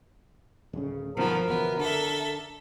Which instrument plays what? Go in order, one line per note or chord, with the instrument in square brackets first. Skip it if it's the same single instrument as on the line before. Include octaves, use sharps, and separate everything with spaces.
[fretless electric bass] D1 C#3
[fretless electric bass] G1 B2 D#3 [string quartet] F3 B3 [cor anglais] A#4
[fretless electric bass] F#1 E2 B2 [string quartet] B3
[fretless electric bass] D3 [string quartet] A4 E5